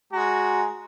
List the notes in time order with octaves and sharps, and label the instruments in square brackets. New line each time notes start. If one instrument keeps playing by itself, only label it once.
[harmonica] G#3 A#5 [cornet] F#4